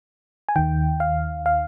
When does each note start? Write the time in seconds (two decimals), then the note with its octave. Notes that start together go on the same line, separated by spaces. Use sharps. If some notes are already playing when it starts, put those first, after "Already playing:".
0.49 G#5
0.56 D#2 D#3 G5
1.00 F5
1.46 F5